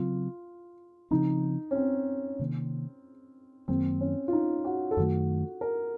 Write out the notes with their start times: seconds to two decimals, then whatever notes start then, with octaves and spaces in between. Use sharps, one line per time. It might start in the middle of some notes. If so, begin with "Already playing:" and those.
Already playing: C#3 F#3 C4 F4
1.11 C#3 F3 C4 D#4
1.71 C#4
1.75 C4
2.39 C3 D#3 A#3
3.68 F#2 D#3 F#3 A#3 C4
4.01 C#4
4.28 F4
4.33 D#4
4.65 F#4
4.91 A4
4.97 F#2 D#3 A3 F#4
5.61 A#4